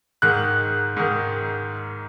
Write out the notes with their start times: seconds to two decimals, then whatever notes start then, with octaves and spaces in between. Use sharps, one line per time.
0.22 G#2 D#3 F#6
0.97 G#2 D#3